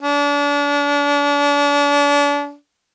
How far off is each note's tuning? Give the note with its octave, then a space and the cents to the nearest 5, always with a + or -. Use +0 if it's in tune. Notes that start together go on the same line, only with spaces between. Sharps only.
D4 -35